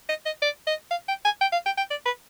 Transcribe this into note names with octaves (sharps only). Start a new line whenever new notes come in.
D#5
D#5
D5
D#5
F5
G5
G#5
G5
F5
G5
G5
D5
B4